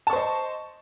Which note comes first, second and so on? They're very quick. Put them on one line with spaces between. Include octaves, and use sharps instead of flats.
A5 C#6 C5 D#5